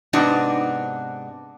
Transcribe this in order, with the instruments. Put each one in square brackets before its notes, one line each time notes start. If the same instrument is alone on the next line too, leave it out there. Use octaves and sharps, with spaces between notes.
[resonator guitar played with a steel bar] G#2 C3 B3 D4 D#4 F#4